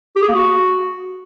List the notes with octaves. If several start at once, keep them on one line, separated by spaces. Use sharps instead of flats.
G4
G#4
A#3
F#4